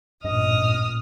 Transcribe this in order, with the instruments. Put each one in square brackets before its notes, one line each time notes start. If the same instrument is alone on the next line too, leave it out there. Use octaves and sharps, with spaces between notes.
[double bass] A1 A#2 [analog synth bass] G2 [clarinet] D#5 [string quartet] D#6 F6